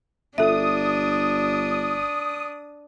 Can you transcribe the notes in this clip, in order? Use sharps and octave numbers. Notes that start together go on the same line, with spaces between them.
G1 D4 F4 A4 E5 D#6